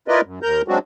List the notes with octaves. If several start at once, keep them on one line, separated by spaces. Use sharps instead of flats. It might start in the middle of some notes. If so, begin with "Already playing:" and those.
E4 F4 A#4 B4 D5 D#5
F#2
D#2 A#4 A#5 G6
F#3 G#3 C4 D4 F#4